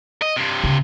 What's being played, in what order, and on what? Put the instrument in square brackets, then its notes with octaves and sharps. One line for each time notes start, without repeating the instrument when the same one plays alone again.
[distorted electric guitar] D#5
G2 C3
[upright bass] C#3